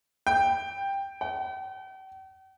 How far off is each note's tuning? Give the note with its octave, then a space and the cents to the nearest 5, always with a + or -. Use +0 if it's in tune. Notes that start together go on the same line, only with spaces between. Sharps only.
G5 +5
G5 -45